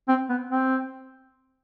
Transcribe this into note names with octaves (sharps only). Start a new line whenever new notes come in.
C4
B3
C4